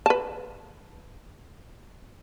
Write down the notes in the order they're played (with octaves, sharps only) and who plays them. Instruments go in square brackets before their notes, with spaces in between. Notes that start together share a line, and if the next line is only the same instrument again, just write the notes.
[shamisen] B4 A5